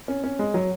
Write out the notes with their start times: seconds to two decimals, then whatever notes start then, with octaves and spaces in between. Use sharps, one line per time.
0.08 C#4
0.24 C#4
0.39 G#3
0.54 F#3